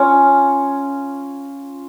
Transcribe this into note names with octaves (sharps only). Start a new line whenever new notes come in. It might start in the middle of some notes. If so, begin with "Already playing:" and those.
Already playing: C#4 F4